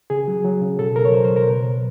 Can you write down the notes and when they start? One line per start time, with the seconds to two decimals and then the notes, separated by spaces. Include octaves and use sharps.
0.10 C#3 G#4
0.28 F#3
0.45 F#3
0.62 C#3
0.79 B2 A4
0.96 F#3 A#4
1.05 C#5
1.13 F#3 C5
1.24 C5
1.30 B2
1.36 A#4
1.47 B2 B4
1.65 F#3